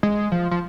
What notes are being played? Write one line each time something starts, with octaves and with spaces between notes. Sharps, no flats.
G#3
F3
F3